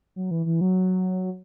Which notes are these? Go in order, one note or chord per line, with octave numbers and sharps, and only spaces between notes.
F#3
E3
E3
F#3